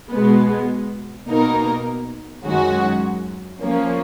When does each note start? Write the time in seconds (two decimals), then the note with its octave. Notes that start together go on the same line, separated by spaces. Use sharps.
0.12 B2 G#3 B3
1.27 B2 A#3 D#4 A#4
2.44 F#2 D#3 G#3 C#4 F#4
3.60 F3 A#3 C#4